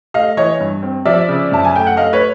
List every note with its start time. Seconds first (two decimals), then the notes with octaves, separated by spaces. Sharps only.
0.14 A3 D#5 F5
0.37 E3 C#5 D#5
0.60 G2
0.83 C4
1.05 F3 D5 E5
1.29 C#3
1.52 F#2 A5
1.65 G#5
1.75 A3 G5
1.87 F#5
1.97 A3 D#5 F5
2.13 B4 C#5